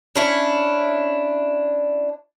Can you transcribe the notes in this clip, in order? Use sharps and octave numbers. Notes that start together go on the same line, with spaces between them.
C#4 D4 E4